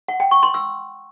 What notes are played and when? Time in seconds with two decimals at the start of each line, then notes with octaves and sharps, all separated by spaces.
0.08 F#5
0.20 G5
0.31 C#6
0.43 C6
0.54 E6